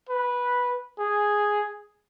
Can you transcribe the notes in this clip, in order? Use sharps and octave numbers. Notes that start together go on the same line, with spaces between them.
B4
G#4